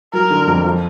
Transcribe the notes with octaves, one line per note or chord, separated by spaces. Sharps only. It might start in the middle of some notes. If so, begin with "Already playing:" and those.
F#3 A#4
D3
F2
F3